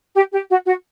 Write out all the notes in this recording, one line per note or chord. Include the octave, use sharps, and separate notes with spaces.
G4
G4
F#4
F#4